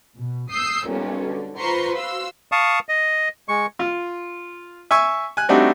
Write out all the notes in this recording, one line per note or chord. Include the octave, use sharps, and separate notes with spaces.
B2
D#6 E6 G6 C7
B1 A#2 G3 C#4
D3
F4 B4 C5 A#5 C6 C#6
F#4 F5 C6 E6
F5 A5 C#6 D#6
D#5
G#3 C#6
F4
E5 G#5 C#6 E6
G#5 F#6
G3 A3 C4 D4 D#4 F#4